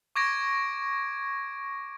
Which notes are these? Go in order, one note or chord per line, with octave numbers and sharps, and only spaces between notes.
C#6 D6 G#6 A#6 D7